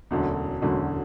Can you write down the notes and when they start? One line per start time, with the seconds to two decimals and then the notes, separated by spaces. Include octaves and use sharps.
0.11 E1 D2 D3 F#3 C#4
0.62 E1 D2 D3 F#3 C#4